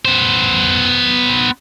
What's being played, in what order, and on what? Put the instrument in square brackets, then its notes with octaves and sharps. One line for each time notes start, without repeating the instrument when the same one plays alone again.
[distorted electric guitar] B3 C5